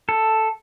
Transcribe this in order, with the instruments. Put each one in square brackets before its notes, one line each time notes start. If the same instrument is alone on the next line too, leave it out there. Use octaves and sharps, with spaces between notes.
[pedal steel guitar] A4